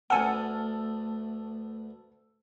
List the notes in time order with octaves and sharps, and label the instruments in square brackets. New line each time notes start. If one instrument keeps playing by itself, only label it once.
[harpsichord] D2 B3 [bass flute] A3 [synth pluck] F#5 G#5 [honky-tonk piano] A5 E6 F6